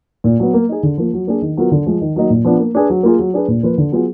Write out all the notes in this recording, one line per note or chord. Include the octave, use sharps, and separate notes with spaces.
A#2
F#3 B3
A#3
D#4 G#4
D3
F3 A#3
F#3
A#3 D4 G#4
D#3
F#3 B3 F4 A#4
D3
F3 G#3
D#3
F#3 A#3 D#4
A#2
F3 B3 D4
A#3
D4 G#4 B4
F#3
A#3 F4 G#4
F#3
D4 G#4 B4
A#2
F3 A#3 F4 B4
D3
F#3 B3 F4 G#4